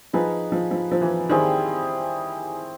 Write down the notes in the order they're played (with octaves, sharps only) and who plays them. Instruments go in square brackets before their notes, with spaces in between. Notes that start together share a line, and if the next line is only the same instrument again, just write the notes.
[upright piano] F3 [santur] D#4 G#4 B4
[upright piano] F3
F3
F3
E3
[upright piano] D#3 [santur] G3 C4 E4 G#4